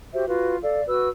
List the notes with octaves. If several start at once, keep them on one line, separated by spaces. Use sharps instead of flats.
F#4 G4 C5 E5
F4 F#4 B4 F5
A4 D5 F5
F#4 B4 E6